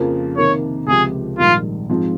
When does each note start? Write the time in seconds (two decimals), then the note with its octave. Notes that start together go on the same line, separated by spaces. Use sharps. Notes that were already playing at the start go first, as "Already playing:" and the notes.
Already playing: F2 C#3 F3 A#3
0.37 C3 D#3 A#3 C#5
0.87 C#2 C3 F3 C4 G4 G#4
1.38 A#1 G#2 D#3 G3 F4
1.89 G#2 F3 G#3 C4 F4